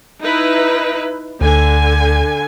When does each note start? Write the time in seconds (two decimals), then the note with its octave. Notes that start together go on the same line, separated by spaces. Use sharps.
0.21 D#4 E4 B4
1.41 D2 D3 G#5